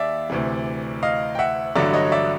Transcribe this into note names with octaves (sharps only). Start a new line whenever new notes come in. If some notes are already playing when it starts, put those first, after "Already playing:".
Already playing: D#2 D5 E5
D2 C3 E3
D#5 F5
G5
E5 F#5
A1 G2 D3 F#3 D5 E5
C#5 D#5
D5 E5